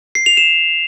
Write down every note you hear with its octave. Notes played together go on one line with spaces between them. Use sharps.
C7
F7
E7